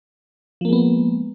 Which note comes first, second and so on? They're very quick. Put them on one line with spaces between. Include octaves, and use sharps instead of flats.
F3 A#3 G#3 B3